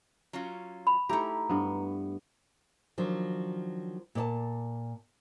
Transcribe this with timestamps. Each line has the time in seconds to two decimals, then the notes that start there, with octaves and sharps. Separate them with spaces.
0.33 F#3 C#4 F4
0.87 B5
1.09 A3 D#4 E4 G4 A#5
1.49 G2 B3
2.98 D#3 F3 F#3 D4
4.15 A#2 D5 A5